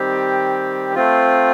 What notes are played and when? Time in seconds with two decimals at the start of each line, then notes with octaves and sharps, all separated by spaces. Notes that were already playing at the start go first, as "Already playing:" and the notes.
Already playing: D#3 G3 C4 G4
0.95 A3 C4 F4